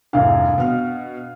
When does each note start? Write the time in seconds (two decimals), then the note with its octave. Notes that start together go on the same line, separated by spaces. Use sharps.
0.13 F1 C2 G#2 D4 F5
0.58 B2 F6